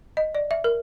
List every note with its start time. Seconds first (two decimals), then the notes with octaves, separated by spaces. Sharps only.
0.17 D#5
0.35 D5
0.51 E5
0.64 A#4